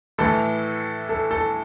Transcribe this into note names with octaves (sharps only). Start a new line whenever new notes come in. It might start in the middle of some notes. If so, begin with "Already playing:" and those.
A2 E3 A4
A4
A4